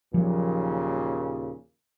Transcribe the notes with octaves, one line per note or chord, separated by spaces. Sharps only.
D#2 A#2 C#3 F3 F#3